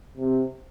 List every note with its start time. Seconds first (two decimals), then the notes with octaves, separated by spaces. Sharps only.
0.17 C3